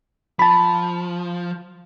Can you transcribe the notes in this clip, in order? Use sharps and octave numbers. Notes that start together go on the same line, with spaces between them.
F3 A5 B5